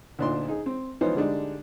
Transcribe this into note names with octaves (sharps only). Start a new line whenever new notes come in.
D2 A#2 D4 D#4 C6
D#4 G#4
C4
E3 F3 B3 D#4 C5 C#5
D3 G3 G#3 D4 D#4